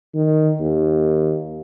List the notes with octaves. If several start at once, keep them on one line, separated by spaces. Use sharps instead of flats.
D#3
D#2